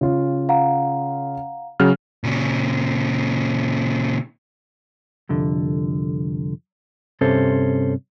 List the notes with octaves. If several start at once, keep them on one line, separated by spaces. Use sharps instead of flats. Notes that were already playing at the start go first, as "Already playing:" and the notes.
C#3 F4
F5 F#5 A#5
C#3 F#3 F6
A#2 C#3
C2 F2 D3
G2 C3 C#4 A4 C5